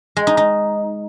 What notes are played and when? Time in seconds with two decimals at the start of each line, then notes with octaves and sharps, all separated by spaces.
0.17 G#3
0.27 D#4
0.37 D#4